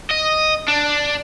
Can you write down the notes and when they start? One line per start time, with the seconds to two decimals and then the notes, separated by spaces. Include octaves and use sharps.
0.11 D#5
0.68 D4